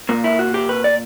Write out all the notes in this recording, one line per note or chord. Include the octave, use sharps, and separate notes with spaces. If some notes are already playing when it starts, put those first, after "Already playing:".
A#2 A#3
E4
F#4
G4
B4
D5